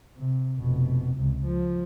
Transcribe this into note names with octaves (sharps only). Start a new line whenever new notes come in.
C3
F1 B2
C#2 C3
F3